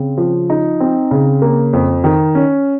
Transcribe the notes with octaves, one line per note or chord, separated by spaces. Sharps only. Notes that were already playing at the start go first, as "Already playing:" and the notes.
Already playing: C#3 C4
F3
D#4
C4
C#3
A#3
F2
D#3
C#4